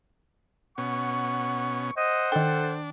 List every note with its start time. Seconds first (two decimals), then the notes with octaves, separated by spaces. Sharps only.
0.78 B2 C#4 F#5 C#6
1.97 C5 D#5 E5 F#5
2.32 D#3 D4 A4 G5